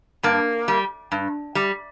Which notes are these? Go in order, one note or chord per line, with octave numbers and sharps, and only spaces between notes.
G2 A#3
G3
G2
G3